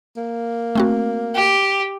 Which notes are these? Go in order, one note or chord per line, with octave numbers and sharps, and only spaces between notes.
A#3
A3 C4 F#4
G4